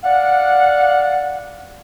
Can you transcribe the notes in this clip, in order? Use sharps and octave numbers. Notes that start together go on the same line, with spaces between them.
D5 F5 F#5